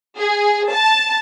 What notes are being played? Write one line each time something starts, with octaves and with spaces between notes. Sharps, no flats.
G#4
A5